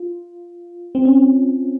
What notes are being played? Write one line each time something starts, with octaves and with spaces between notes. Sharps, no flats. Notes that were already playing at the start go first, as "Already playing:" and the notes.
Already playing: F4
C4
C#4